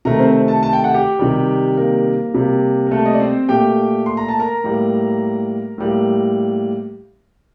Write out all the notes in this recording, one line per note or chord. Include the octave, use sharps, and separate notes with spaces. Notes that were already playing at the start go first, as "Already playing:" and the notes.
C3 D#3 A3 A#4 A#5
C4 C5
A4 A5
A5
G5
F#5
G4 G5
C3 D#3 G3
A#3 A#4
C3 G3 A#3
A#4
A3 A4
D#5
D5
C4 C5
A#2 A3 G4 G5
C6
A#5
A5
A#4 A#5
A2 G3 A#3
A2 G3 A#3